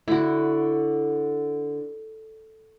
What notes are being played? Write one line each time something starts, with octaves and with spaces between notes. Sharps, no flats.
D3 E4 F#4